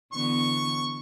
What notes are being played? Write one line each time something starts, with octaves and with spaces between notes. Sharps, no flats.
D3 E3 B3 C#6